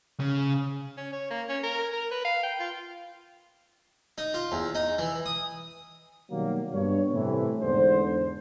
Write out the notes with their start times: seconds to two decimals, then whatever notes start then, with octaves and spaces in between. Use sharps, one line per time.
0.20 C#3
0.97 C#4
1.13 C#5
1.30 A#3
1.49 C#4
1.63 A#4
1.93 A#4
2.12 B4
2.25 F5
2.43 G5
2.60 F4
4.18 D#4
4.34 F4
4.52 E2
4.75 D#4
4.98 E3
5.26 D#6
6.31 B2 D#3 F#3 G3 A#3
6.73 G2 B3 C#5
7.12 A2 C3 E3
7.61 E2 G#2 D3 D4 C5